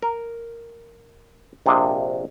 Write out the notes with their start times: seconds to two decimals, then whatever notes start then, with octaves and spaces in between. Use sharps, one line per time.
0.02 A#4
1.66 A#1 C3 A#3 D4 D#5